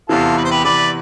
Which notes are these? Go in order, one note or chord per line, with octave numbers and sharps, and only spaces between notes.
E2 C3 E3 F4 A4
B4
C5
G4 B4
E2 C3 E3 B4 D5